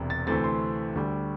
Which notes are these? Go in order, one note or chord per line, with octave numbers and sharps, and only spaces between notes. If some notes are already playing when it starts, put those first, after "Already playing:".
Already playing: E1 E2 C3
A6
D2 C3 E3 A3 C4 A6
C6
D2 D3 G3